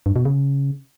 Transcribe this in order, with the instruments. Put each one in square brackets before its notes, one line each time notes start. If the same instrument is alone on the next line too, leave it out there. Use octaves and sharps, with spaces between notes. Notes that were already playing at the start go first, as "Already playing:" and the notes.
[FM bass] G2
B2
C#3